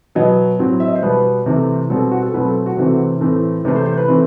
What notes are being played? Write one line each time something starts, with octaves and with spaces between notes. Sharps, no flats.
B2 F#3 B3 D#5
A2 F#3 C4
E5
D#5
C5
B2 G3 B3 B4
C3 E3 A3 C4
B2 G3 C4 A4
F#4
A4
B2 F#3 A3 C4 B4
A4
F#4
C3 E3 A3 C4
A2 E3 A3 C4
C3 E3 A3 B4
C5
C5
B4
E3 A3 C4